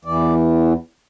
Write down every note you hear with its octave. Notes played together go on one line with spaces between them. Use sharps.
E2 E3 D5